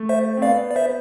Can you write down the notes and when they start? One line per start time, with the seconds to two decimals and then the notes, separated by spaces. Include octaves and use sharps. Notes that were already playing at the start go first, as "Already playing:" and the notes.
Already playing: A3
0.09 C5 E5
0.37 C4
0.42 B3 D5 F5
0.71 D5
0.76 C5 E5